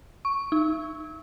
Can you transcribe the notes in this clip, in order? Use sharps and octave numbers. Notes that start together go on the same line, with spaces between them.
C#6
D#4